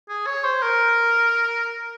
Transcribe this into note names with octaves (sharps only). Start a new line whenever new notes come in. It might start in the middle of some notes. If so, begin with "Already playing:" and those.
G#4
C#5
C5
A#4